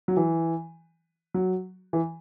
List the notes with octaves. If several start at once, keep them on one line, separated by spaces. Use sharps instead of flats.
F#3
E3
F#3
E3